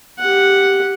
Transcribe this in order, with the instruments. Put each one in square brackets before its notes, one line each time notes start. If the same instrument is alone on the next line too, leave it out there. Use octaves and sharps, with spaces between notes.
[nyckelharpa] G4 F#5